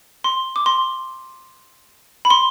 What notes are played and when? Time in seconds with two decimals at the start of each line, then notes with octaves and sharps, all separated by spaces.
0.24 C6
0.56 D6
0.66 C6
2.25 B5
2.30 C6